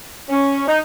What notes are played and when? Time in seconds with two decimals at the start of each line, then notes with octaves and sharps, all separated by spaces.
0.29 C#4
0.67 D#4